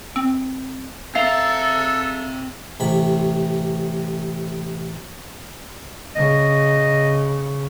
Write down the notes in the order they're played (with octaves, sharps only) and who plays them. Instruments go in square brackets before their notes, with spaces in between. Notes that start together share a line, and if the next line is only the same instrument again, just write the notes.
[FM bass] C4
[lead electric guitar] C4 A#5 [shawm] A4 [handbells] E5 F5 C7
[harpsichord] A1 C3 B5
[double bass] C#3 [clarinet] D#5